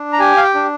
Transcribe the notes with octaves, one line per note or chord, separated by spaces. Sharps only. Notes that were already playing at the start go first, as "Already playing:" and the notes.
Already playing: D4
A#5
G4 G#5
F5
G5
D4